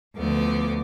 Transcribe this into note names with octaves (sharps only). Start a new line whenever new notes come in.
D2 F3 A3 B3 D6